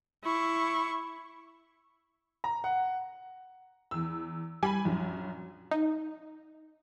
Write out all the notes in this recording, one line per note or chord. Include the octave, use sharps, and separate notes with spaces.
E4 C#6
A#5
F#5
E2 E6
G3 G#5 B5
A#1 F#2
D#4